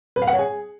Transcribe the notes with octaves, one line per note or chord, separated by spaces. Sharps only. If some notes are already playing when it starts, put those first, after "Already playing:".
B4
F5
F#5
C#5
G#4